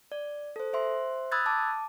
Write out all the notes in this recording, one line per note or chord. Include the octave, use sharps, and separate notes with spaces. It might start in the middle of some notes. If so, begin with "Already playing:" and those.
D5
A4 C5
C5 E5 C6
B5 D#6 E6 F#6 G#6 A6
A5 D6